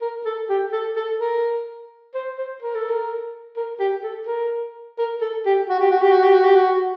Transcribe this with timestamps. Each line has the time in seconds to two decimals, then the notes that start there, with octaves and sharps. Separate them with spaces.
0.02 A#4
0.25 A4
0.50 G4
0.72 A4
0.96 A4
1.20 A#4
2.15 C5
2.38 C5
2.62 A#4
2.75 A4
2.89 A#4
3.57 A#4
3.80 G4
4.04 A4
4.27 A#4
4.98 A#4
5.21 A4
5.46 G4
5.69 F#4
5.80 G4
5.91 F#4
6.02 G4
6.12 F#4
6.23 G4
6.33 F#4
6.45 G4
6.55 F#4